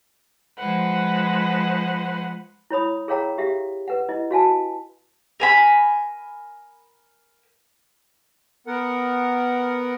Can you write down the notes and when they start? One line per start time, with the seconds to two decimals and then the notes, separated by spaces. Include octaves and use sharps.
0.58 F3 G#3 B4 C5 F#5
2.70 E4 C#5 B5 D#6
3.08 G#4 A#4 C#5 F5 G5 A#5
3.38 G4 E5 F5
3.88 B4 F#5
4.09 E4 D#5
4.31 F#4 F5 G#5 A5
5.40 A#4 G#5 B5
8.67 B3 A#4 F#5